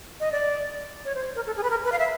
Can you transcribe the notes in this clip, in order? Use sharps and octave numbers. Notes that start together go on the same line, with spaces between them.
D#5
D5
C#5
C5
A#4
A4
G#4
B4
A#4
B4
F5
E5